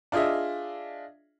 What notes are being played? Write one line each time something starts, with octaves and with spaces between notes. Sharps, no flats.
D4 F4 G#4 D#5 E5